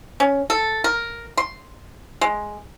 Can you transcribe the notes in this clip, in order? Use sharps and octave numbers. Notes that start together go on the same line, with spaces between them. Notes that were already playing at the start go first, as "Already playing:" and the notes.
C#4
A4
A#4
C6
G#3